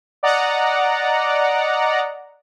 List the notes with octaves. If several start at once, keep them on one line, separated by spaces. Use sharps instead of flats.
D5 D#5 F#5 A#5